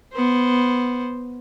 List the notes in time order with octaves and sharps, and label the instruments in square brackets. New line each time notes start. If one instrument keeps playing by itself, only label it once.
[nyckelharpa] B3 C5